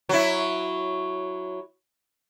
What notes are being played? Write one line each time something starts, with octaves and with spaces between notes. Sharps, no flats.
F#3 E4